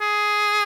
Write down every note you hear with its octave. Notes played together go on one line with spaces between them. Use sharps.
G#4